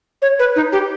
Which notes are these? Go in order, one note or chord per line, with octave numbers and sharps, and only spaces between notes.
C#5
B4
D#4
G4